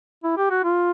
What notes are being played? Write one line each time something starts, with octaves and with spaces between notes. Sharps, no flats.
E4
G4
F#4
F4